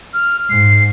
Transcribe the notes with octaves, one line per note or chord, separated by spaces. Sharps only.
F6
G#2 C7